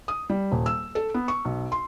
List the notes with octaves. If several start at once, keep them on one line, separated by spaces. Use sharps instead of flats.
D#6
G3
D#1
E6
A4
B3
C#6
B1
C6